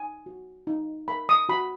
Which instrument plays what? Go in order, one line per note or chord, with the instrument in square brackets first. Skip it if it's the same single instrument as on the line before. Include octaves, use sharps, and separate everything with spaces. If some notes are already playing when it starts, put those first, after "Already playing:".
Already playing: [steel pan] D#4 G#5
F#4
D#4
A#4 B5
D#6
F#4 B5